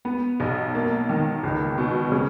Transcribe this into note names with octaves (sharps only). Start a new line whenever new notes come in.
B3
B1
A#3
D#3
C#2
B2
C#3